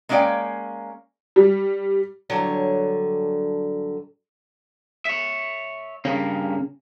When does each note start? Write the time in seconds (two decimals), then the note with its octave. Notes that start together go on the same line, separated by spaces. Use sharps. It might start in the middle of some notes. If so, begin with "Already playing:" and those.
0.09 G#3 A#3 C#4 D5 F5 G5
1.36 G3
2.30 G2 D3 F#3 C#5
5.05 C#5 E5
6.05 G2 C#3 A#3